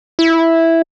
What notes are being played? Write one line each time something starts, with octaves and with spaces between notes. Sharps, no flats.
E4